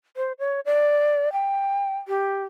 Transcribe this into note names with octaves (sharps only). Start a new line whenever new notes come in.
C5
C#5
D5
G5
G4